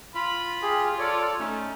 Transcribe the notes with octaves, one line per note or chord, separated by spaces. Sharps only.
F4 B5
G4 G#4
A4 C#5 D5
A3 C#4 D#4